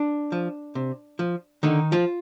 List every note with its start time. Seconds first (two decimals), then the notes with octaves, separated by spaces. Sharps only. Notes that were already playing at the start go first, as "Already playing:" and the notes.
Already playing: D4
0.32 F3
0.75 C3
1.19 F3
1.63 D3 D#3 D#4
1.92 F3 F4